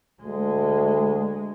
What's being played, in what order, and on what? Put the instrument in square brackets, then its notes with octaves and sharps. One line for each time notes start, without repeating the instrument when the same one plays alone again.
[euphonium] D2 [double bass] G#3